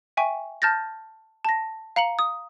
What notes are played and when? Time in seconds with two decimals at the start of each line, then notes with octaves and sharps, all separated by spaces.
0.17 E5 G5 G#5 C#6
0.62 A5 F6 G6 A6 A#6
1.45 A5 A#6
1.96 F5 A#5 C#7 F#7
2.19 D#6